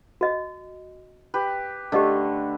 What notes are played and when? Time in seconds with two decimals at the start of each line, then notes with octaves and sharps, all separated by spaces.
0.21 F#4 D#5
1.34 G4 B4
1.92 D3 A3 G4 D#5 D6